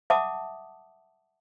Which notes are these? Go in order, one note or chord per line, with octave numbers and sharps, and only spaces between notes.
E5 F#5 A5 D6 D#6